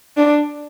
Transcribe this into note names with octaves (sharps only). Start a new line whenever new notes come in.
D4